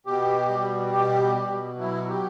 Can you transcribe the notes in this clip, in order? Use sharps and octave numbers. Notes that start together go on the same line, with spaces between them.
B2 G4
G3
B2 G4
B2
F#3 E4
G4